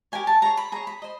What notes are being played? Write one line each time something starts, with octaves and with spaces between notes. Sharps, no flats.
G4 A#4 C#5 G#5
A5
G#4 C#5 A#5
B5
G#4 C#5 A#5
B5
C5 D#5